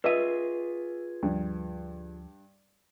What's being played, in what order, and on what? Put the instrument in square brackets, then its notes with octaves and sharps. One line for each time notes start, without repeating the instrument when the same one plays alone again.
[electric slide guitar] F4 G#4 [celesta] B4 D#7 [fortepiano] D#5 E5
[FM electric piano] D2 F3 [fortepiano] G2